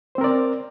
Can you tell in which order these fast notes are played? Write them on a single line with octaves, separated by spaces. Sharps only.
C5 C4 A#4 D5